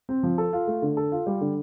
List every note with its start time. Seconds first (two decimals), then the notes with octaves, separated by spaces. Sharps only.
0.09 C4
0.23 F3
0.38 A4
0.53 F4
0.67 A3
0.82 D3
0.97 A4
1.12 F4
1.27 G3
1.41 D3